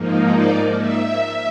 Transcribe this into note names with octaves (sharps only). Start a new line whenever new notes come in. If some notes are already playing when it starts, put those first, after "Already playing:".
Already playing: G#2 F3 A#3 D#4
D5
E5